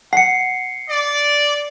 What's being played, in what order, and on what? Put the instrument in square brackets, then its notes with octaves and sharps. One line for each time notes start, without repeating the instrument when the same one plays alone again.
[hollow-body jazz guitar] F#5 [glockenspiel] C7 C#7
[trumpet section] D5